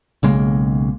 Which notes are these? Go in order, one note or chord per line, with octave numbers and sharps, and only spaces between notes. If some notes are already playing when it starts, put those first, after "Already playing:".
B1 C#3 G#3 A#3